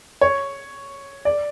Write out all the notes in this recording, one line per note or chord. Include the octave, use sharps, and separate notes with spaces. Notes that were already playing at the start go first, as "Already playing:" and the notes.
C#5
D5